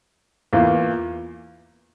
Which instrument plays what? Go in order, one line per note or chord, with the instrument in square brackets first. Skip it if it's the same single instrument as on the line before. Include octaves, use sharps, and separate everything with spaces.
[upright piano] E2 E3 A#3 F4